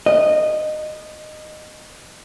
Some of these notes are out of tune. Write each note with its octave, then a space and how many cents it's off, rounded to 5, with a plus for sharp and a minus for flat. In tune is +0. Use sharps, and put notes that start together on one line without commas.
D#5 -15